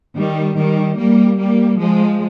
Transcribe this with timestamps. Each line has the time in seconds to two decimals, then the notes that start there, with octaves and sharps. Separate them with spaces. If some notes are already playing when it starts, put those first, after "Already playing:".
0.16 D#3 G3
0.57 D#3 G3
0.98 G3 A#3
1.38 G3 A#3
1.79 F3 G#3